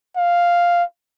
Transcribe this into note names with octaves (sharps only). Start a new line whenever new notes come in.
F5